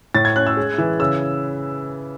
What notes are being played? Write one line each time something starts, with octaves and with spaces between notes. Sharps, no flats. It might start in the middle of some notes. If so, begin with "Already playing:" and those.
A2 A6
G#6
C#4 F#6
E6
G#3
E3
C#3 E6